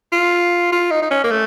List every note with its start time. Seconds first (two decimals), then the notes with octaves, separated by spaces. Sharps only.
0.12 F4
0.72 F4
0.91 D#4
1.02 D#4
1.11 C#4
1.24 A#3
1.31 A3